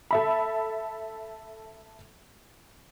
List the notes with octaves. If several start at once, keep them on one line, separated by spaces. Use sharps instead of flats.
A4 E5 B5